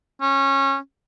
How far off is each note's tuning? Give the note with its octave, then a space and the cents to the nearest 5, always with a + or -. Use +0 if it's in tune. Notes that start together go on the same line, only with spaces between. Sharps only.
C#4 -20